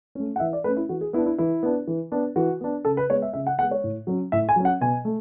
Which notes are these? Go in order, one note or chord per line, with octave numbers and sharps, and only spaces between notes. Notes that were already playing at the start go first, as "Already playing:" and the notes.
A3 C#4
F#5
E3 E5
D5
A3 C#4 B4
E4
E3 F#4
G#4
B3 D4 E4
E4
E3 E4
B3 D4
E3
B3 D4
E3 F#4
B3 D4
C#3 A4
B4
G#3 B3 C#5
E5
C#3 E5
F#5
G#3 B3 F#5
C#5
A2
F#3 C#4
A2 E5
G#5
F#3 C#4
F#5
B2 G#5
A3